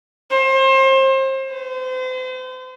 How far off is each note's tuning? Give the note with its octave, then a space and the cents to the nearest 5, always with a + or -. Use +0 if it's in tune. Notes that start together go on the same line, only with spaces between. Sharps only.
C5 +30
C5 -35